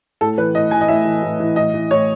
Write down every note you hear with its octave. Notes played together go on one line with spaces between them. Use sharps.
A2 A4
E3 B4
A2 D#5
E3 G#5
D#5
A2 E5
E3
A2
E3
A2 D#5
E3
A2 C#5